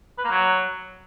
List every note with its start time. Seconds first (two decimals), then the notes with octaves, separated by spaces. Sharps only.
0.18 B4
0.24 A#3
0.31 F#3